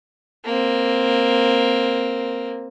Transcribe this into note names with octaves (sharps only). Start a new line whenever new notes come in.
A#3 C4